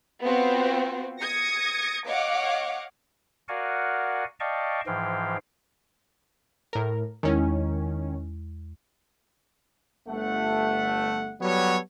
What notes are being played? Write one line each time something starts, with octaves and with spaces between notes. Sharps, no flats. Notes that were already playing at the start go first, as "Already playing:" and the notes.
B3 C4 F4 F#4 C5
D#6 G#6 A#6 C#7
C#5 D#5 F5 F#5 D6
F#4 A#4 D5 F5 F#5 G#5
D5 D#5 F5 G5 A5 C#6
G#2 E3 F3 F5 G5
A2 A#4
E2 D#3 G#3 C#4 E4
G1 A3 F#5
F#3 G3 B3 F#4 A4 C#5